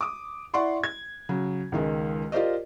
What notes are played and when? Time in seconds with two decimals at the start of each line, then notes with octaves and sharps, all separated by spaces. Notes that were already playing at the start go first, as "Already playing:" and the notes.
0.01 D6 D#6
0.54 E4 D5 F#5 C6 C#6
0.84 G#6
1.29 C#3 F#3
1.72 C#2 D#3 G#3
2.32 F4 G4 A#4 C5 D5 D#5